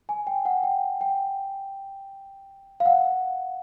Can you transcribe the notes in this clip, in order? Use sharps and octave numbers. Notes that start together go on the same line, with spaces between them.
G#5
G5
F#5
G5
G5
F5
F#5